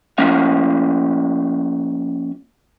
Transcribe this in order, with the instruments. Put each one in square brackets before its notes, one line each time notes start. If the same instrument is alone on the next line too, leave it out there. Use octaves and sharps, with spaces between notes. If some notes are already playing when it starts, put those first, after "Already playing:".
[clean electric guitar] F3 A#3 C#4 F5